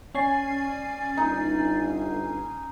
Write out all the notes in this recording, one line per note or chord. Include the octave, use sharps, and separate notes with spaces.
C#4 D5 G#5 C7
G1 D#4